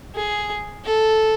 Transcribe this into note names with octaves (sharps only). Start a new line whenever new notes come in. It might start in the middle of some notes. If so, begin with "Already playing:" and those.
G#4
A4